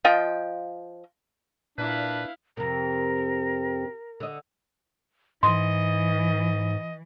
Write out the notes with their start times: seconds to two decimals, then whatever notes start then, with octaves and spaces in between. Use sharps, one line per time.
0.04 F3 F4 D#5 G5
1.78 A#2 D4 E4 B4 F5
2.57 F2 C3 A#4
4.20 D3 D#5
5.43 G#2 E3 D#5 C6